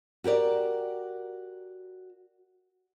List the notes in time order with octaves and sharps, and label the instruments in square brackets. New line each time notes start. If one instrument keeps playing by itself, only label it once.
[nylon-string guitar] F#4 G4 A#4 D5